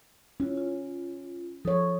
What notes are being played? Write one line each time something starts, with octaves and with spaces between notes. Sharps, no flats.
C#4 E4 F4
F4
F3 A4 C#5 D#6